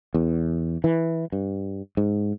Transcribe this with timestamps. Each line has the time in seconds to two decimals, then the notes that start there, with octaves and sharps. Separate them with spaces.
0.14 E2
0.84 E3
1.32 G2
1.97 G#2